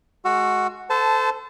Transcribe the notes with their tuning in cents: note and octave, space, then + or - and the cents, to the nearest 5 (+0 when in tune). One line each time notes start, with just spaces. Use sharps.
G#3 +25 F#4 +0 E6 +35
A4 +0 C5 -30 A5 -10